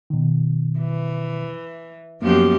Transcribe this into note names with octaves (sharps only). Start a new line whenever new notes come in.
B2 D#3
E3
F#2 F3 A#3 B3 G4